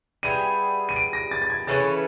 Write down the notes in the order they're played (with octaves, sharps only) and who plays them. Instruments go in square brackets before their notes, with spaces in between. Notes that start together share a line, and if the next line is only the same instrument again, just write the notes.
[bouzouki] G3 B3 E4 G#4 [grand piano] D#7
[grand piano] D#7
D7
A#6
A6
A6
G#6
[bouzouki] C#3 E3 A3 C#4 [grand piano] A6